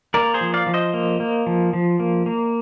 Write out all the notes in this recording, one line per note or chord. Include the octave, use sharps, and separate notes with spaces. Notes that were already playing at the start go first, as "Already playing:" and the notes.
A#3 A#4 D5
G#4 C5
F3
D5 F5
F3
C5 D#5
A#3
A#3
F3
F3
A#3
A#3